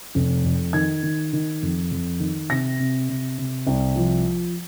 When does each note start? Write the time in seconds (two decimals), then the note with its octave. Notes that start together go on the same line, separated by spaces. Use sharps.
0.15 F1
0.44 F2
0.73 D#3 G#6
1.03 D#3
1.33 D#3
1.62 F2
1.91 F2
2.20 D#3
2.50 C3 A#6
2.79 C3
3.09 C3
3.38 C3
3.67 C2
3.96 F3